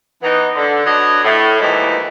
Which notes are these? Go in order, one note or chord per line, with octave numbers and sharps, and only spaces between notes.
E3 B3 D#4
D3
D4 F#4 B4 C#5 D#5
A2
D#2 E3 F3 G#3 D#4 E4